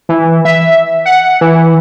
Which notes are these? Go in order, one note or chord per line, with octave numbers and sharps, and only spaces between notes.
E3
E5
F#5
E3